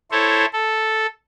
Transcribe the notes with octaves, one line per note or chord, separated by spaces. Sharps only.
E4 A4 C5 C#5
A4